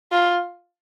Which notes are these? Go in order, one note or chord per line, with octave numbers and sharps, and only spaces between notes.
F4